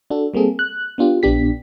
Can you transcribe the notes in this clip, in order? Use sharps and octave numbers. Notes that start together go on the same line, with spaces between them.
D4 F#4 A4
G3 A#3 C4 G#4 A4
F#6
B3 D4 F4 G4
A#1 B3 D4 G4 B6